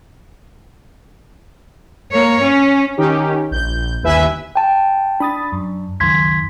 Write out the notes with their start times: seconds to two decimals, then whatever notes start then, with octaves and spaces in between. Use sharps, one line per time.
2.12 A#3 C#5
2.42 C#4
2.97 D#3 C#4 D#4 G4
3.51 A#1 G6
4.03 G1 D#2 E4 B4 E5 G#5
4.55 G5 A5
5.20 D4 B5 D#6 A6
5.52 F#2
6.00 C#2 F#2 D#3 C6 G#6 B6